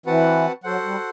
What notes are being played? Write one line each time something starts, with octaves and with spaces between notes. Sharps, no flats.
E3 C4 F#4 B4 F#5 A5
F#3 F#4 A4 C5 F#5
G3